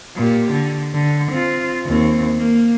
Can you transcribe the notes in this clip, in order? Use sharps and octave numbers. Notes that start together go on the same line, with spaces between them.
A#2 G4
D3
D3
C4 F4
D#2 C4
A#3